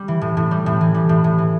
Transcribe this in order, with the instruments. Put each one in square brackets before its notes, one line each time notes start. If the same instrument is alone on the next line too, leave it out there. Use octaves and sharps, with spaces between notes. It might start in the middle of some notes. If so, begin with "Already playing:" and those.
Already playing: [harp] G3
E3
A2
A2
G3
A2
E3
G3
A2
A2
E3